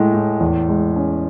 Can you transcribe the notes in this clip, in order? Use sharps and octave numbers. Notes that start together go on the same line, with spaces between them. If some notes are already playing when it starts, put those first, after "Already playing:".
Already playing: A2 G#3
A2
E2
G#3
C#4